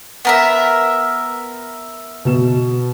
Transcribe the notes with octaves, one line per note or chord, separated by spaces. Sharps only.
B3 A#4 E5
B2 E7